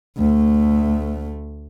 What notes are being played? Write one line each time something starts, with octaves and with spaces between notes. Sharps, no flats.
D2 A3